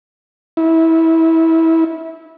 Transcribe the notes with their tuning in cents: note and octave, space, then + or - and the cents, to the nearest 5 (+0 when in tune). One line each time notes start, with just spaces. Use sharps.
E4 -20